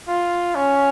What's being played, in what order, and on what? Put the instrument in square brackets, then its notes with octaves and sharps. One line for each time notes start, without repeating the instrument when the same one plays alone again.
[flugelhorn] F4
C#4